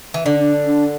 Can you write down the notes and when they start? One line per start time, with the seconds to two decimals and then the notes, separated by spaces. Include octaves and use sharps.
0.14 E3
0.25 D3 D4
0.39 D4
0.66 D4